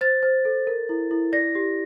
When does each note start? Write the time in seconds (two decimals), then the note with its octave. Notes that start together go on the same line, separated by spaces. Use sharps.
0.01 C5 A6
0.23 C5
0.45 A4
0.67 A#4
0.89 E4
1.11 E4
1.33 D5 A#6
1.55 G4